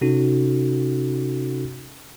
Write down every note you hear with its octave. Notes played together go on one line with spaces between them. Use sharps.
C3 C#4 D#4 F#4 A4